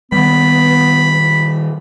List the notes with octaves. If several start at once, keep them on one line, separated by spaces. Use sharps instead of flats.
D#3 G3 B3 B5